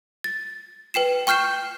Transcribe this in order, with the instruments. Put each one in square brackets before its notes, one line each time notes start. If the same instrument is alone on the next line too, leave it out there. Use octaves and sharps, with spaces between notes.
[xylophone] A6
B4 G5 C7 E7
G5 C#6 F6 G6 C7 E7